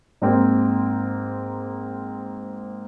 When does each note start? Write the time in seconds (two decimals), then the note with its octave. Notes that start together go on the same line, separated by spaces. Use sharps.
0.22 G#2 A#3 C4